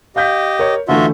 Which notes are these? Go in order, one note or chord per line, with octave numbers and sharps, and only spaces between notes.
G4 D#5 F5 G6 B6
A#4 C#5
D3 E3 A3 F4 F#4 E5